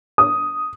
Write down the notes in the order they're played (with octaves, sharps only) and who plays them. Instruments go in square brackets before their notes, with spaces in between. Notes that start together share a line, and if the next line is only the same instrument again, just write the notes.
[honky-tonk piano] D#6